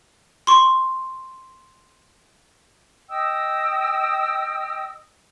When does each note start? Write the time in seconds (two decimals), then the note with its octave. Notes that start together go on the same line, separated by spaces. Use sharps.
0.47 C6 C#6
3.10 D#5 G5 D#6 E6